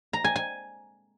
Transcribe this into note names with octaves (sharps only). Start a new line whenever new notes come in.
A#5
G#5
G#5